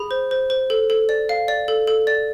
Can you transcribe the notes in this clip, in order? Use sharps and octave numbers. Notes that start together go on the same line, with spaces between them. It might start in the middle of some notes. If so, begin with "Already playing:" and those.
Already playing: G#4 B5
C5
C5
C5
A4
A4
D5
F5
D5
A4
A4
D5